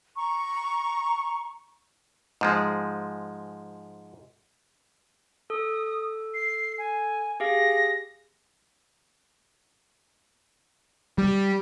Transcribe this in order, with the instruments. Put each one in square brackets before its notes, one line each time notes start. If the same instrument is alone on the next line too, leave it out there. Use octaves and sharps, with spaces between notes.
[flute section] A#5 C#6
[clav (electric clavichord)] G#2 F3 G#3
[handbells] A4 [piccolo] D#6
[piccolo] C7
G#5
[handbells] G4 G#4 F5 [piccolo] A#6
[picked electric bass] G3